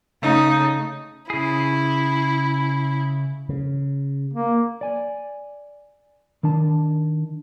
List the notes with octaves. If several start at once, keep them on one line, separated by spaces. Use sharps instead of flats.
C#3 A3 D#4
C#3 E4 G#4
C#3
A#3
D5 G#5
D#3 D4 A5